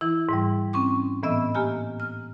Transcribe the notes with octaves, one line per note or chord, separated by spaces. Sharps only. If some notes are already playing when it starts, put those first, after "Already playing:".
E3 E4
G#2 E3 G3
C4 C#4 C#6 D6
A2 E3 B3 D#5 E5 E6
A#3 G4 G#5 F6
F6